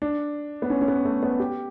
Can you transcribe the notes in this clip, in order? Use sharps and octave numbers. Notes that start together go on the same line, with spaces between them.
D4
B3
C#4
C#4
B3
A3
B3
G4